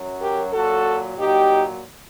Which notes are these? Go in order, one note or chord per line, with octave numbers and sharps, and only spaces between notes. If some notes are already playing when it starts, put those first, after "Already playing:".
Already playing: F#2 F#3
G4 A#4
A#2 F#3 F#4 A4
A#2 F#3 D#4 G4